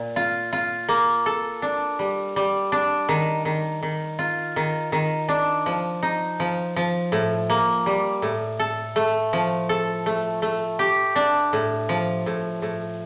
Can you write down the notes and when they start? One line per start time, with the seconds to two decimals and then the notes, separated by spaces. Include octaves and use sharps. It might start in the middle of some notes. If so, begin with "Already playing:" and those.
Already playing: A#2
0.16 F4
0.53 F4
0.89 A#3
1.26 A4
1.62 D4
1.99 G3
2.36 G3
2.72 D4
3.09 D#3
3.45 D#3
3.83 D#3
4.19 F4
4.56 D#3
4.92 D#3
5.29 D4
5.66 F3
6.03 D#4
6.40 F3
6.76 F3
7.12 A2
7.50 A#3
7.86 G3
8.22 A2
8.59 A4
8.96 A3
9.33 F3
9.69 A4
10.06 A3
10.42 A3
10.79 G4
11.16 D4
11.53 A2
11.89 F3
12.26 A2
12.62 A2